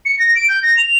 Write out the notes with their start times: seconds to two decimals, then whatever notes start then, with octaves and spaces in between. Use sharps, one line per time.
0.05 C#7
0.19 A#6
0.35 D7
0.49 G6
0.63 A#6
0.77 F7